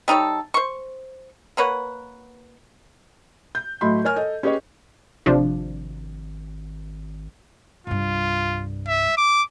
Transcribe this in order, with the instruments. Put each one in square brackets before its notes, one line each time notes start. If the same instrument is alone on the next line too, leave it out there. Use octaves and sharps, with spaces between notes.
[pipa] G3 D#4 A4 C#5
C5 C#6
A#3 B4 C#5 F#5
[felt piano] G6
A2 F#3 A3 D#5 B5 C6
A#4 C#5 G#5 F6
A4 D#5
C#4 G4 G#4 B4 C#5 D#5
[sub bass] G#1 [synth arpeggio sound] C3 F3 D4
[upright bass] C2 G2 [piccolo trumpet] F4
[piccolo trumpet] E5
D6